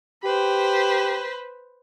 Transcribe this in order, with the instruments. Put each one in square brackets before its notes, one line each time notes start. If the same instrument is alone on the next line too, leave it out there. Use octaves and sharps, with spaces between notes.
[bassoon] G4 [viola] B4 C5